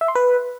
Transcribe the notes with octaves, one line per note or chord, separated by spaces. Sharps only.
E5
C6
B4